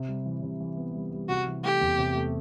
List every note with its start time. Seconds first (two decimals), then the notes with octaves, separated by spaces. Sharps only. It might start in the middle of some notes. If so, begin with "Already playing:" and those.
Already playing: C3
0.08 G3
0.26 E3
0.43 C3
0.60 E3
0.77 B3
0.94 G3
1.12 G3
1.29 C3 F#4
1.46 E3
1.63 A3 G4
1.81 E2
1.98 C3
2.15 A3